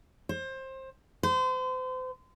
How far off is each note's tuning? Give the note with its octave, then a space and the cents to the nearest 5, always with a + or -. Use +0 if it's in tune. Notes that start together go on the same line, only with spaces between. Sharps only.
C5 +25
C5 -35